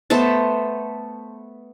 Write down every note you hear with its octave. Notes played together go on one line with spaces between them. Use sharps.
A3 B3 C5 A5